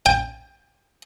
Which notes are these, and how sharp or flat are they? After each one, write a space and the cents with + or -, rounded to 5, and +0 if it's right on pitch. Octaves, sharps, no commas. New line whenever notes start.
G5 +20